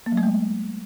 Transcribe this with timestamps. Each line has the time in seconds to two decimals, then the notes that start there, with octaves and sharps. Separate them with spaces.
0.06 A#3
0.12 F#3
0.17 A3
0.23 G#3